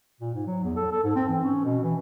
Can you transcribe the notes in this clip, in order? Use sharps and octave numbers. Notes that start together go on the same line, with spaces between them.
A#2
G#2
F#3
E2
A4
A4
G#2
C4
E3
C#4
B2
E3